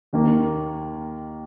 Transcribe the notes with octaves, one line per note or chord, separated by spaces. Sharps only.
D#2 D#3 A#3